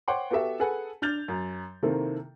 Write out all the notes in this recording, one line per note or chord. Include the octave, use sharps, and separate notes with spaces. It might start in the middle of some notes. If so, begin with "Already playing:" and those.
C5 C#5 F#5 G5 C6 D6
B3 F#4 G4 A4 E5
G#4 A4 B4 F#5 G#5
D4 F6 G6 A6 F7
F#2
C3 D#3 A#3 C4 E4 A4